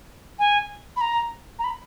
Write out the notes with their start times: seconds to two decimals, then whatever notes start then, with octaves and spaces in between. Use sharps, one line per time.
0.39 G#5
0.96 B5
1.01 A#5
1.59 A#5
1.64 B5